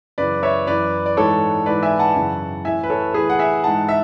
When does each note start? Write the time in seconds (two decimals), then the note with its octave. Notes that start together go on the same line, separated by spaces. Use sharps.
0.18 F#2 C#3 E3 B4 D5
0.43 C#5 E5
0.67 F#2 E3 B4 D5
1.06 D5
1.17 G#2 E3 A4 C#5
1.66 G#2 E3 B4 D5
1.83 E5 G#5
1.99 F#5 A5
2.16 F#2 C#3 E3
2.65 A2 E3 E5 G#5
2.83 B4
2.90 A4 C#5
3.14 A2 E3 G#4 B4
3.30 F#5
3.39 E5 G#5
3.64 G#2 E3 F#5 A5
3.89 E5